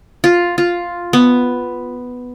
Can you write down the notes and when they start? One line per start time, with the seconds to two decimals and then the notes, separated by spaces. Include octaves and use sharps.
0.24 F4
0.58 F4
1.13 B3